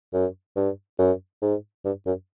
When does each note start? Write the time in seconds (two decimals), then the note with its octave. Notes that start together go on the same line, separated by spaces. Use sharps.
0.13 F#2
0.56 G2
0.99 F#2
1.42 G#2
1.85 G2
2.06 F#2